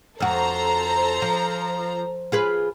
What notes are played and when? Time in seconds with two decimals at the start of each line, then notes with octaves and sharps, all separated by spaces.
0.20 F2 F#4 A4 C5 A#5
1.22 F3
2.32 F4 G#4 B4